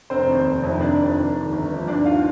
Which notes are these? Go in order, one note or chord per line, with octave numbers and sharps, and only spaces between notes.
F1 C4 C5
D#2 D#3
F1
F2 C3 D#3
F1 D4 D5
F2 D#3
F1
D#2 D#3
G1
G2 F3
D#2 D4 D5
D#3 F4 F5